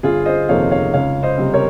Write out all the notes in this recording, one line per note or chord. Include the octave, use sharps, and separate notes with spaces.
G1 F4 G#4
C5 D#5
F2 C3 D#3 A#3 C#5 F5
C#5 F5
C#2 C#5 F5
C5 D#5
C3 G3 C4
A#4 C#5